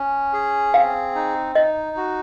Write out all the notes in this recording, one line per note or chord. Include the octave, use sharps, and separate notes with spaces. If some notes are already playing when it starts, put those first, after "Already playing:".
Already playing: C#4
G#4
C4 F5
D#4
D#4 D#5
F#4